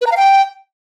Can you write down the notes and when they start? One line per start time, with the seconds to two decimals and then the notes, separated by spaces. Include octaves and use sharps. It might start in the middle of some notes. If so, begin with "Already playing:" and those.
0.01 B4
0.06 A#5
0.12 F5
0.17 G5